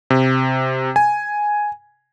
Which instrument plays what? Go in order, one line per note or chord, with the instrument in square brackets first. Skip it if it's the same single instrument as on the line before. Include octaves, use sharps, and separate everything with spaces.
[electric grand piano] C3
G#5